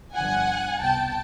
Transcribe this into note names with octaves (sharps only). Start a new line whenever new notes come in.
G1 G2 D3 F3 F#5 G#5
C2 B2 G5 A5